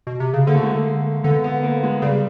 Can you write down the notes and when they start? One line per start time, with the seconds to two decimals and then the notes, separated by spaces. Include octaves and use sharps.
0.07 B2
0.20 C3
0.34 C#3
0.47 D3 A#3
0.55 A3
0.63 G#3
0.71 A3
1.24 D3 B3
1.44 B3
1.63 A#3
1.83 G#3
2.02 C#3 G3